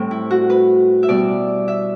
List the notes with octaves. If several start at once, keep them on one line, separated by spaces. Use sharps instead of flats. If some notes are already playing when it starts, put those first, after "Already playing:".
Already playing: A2 G3 C4
E4
F#4
B4
E5
B2 G3 B3 D5
E5